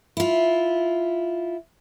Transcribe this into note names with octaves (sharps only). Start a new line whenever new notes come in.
E4 F4